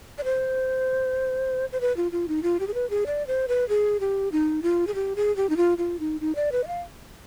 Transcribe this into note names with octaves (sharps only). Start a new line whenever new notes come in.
D5
C5
C5
B4
F4
F4
D#4
F4
G4
G#4
B4
G#4
D5
C5
B4
G#4
G4
D#4
F4
G#4
G4
G#4
G4
D#4
F4
F4
D#4
D#4
D5
B4
D#5
F5